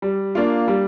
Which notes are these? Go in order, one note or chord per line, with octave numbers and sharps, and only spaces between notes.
G3
A#3 D4 F4
G3